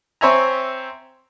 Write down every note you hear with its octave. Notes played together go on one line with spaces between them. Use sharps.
C4 C5 C#5 E5 G#5 A#5